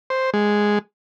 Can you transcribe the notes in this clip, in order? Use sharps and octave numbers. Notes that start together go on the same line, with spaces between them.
C5
G#3